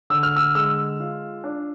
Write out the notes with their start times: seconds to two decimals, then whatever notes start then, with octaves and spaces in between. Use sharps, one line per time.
0.10 D3 E6
0.23 F6
0.36 E6
0.55 G#3 E6
1.00 F4
1.44 D4